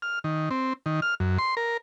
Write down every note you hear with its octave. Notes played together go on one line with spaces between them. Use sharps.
F6
D#3
C4
D#3
F6
F#2
C6
A#4